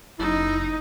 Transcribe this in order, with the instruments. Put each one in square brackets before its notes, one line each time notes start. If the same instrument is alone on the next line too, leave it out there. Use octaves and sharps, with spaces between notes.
[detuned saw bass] F#1 [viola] D#4 [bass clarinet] E4